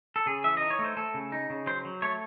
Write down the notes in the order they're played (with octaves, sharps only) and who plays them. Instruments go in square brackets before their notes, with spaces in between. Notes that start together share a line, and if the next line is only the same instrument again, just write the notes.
[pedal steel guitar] A4
C#3 G#4
E3 E5
D#4 D#5
C#5
A3
C5
A3 A4
C#3
D#4
C#3
F#3 C5
F#3
A3 C#5